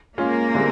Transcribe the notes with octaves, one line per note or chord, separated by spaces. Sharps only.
G#3 A#3 C#4 F4 G#4
D3 G3 C4 E4 G#4